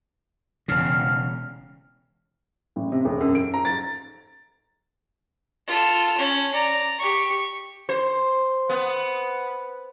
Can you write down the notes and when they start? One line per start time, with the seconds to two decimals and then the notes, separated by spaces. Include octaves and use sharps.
0.68 E1 C#3 F6
2.76 A1
2.92 C3
3.05 E1
3.21 F#2
3.35 D7
3.54 A#5
3.65 A6
5.67 F4 A4
6.17 C#4
6.53 D5 A#5
6.99 G4 C#6
7.89 C5
8.69 B3